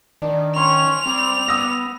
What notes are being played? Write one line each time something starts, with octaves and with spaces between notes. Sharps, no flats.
D#3 D4
C#4 C6 F7
G3 C4
B3 D#6 E6 A#6